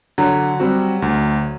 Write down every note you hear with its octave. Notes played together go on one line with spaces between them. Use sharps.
D3 F#3
G3 C4 F#4
D2